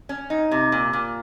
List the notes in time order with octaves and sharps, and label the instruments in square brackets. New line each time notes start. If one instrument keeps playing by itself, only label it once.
[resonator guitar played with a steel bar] C#4
D#4
C3
A#2
A#2